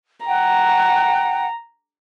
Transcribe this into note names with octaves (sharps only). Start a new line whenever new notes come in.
F#5 G5 A#5